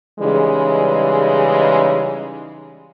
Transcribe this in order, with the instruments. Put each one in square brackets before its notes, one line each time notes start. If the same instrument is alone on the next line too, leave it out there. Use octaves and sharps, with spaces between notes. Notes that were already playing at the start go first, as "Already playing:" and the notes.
[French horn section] C#3 E3 G3 G#3 D#4 G#4